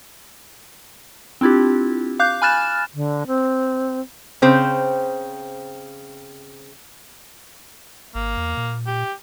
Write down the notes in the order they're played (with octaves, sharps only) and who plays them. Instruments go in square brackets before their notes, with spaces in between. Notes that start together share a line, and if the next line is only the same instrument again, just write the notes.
[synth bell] C4 D4 E4 F4 G4
F5 D6 F#6 G6
G#5 B5 F6 F#6 A6 E7
[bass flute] D3
C4
[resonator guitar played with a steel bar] C#3 C4 C5
[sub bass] G#1 [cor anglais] A#3
[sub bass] E2
A#2
[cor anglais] G4